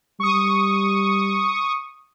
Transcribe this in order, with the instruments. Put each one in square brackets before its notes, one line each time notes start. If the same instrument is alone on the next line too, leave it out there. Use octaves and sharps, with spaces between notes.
[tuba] G3 [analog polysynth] C#6 D#6